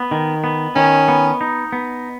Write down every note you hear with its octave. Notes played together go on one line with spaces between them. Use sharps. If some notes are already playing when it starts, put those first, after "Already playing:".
Already playing: B3
D#3
B3
D#3 C#4
B3
D#4
B3